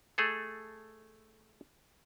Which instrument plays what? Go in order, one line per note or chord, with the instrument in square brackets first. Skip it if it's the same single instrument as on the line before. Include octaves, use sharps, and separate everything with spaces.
[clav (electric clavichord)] A3 G#4 A4